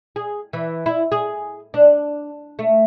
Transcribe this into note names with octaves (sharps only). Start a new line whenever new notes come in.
G#4
E3
E4
G#4
D4
A3